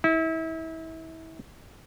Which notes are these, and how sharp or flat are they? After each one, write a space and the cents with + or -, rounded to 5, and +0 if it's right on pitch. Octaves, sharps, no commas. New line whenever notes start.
E4 -30